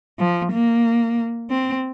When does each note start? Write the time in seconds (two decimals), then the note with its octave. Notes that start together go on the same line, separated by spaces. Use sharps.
0.19 F3
0.53 A#3
1.51 C4